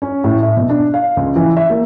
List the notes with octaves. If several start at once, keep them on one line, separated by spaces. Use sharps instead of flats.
C#4
A2
E5
B2
D4
F5
C#2
E3
E5
A#3